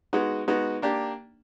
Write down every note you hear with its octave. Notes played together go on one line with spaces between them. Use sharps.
G#3 B3 D#4 F#4
G#3 B3 D#4 F#4
A#3 D4 G4